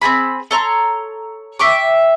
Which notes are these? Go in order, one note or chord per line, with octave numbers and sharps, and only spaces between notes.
C4 F#4 G#4 B5
A4 C#5 A#5 C6
E5 G5 C#6 D6